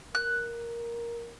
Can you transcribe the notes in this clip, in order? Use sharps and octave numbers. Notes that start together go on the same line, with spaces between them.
A#4 F#6